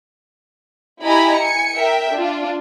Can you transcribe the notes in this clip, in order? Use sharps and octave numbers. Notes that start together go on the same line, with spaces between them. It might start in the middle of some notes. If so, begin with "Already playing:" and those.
E4 G4 D#5 G#5 A#5 B5
G#5 C#7
A#4 E5 G5
D4 F4